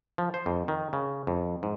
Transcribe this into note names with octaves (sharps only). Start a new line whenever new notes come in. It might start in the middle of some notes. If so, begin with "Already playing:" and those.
F3
C5
F2
D#3
C#3
F2
G#2